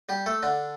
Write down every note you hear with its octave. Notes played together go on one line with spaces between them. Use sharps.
G3 G4
A3 A4
D3 D4